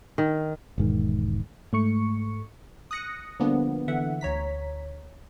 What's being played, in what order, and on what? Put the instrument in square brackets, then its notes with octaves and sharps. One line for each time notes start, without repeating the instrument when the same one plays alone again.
[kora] D#3
[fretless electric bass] E1 G#2 D#3
[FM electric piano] G#2 A3 C#6 C#7
[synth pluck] D#6 F#6 A#6 C#7
D3 F3 G3 A#3 B3 D4
D3 E3 E5 F#5
D2 C#5 A#5 B6